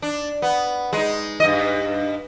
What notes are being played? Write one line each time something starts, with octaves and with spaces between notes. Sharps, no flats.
D4
B3
G#3 D#4
G2 D#5